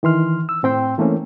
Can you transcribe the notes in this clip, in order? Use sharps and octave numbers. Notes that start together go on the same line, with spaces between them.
D#3 E3 C6 F6
E6
A2 C4 G5 C6
E3 A3 A#3 C4 C#4